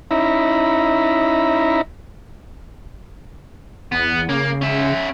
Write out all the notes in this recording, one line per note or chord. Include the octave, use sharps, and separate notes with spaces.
C#4 D#4 E4 E5 A#5 B5
E2 B3
C#3 A#3
C#4 E5